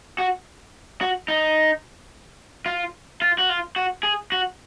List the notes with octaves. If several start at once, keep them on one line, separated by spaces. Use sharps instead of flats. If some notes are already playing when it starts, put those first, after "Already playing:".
F#4
F#4
D#4
F4
F4
F#4
F4
F#4
G#4
F#4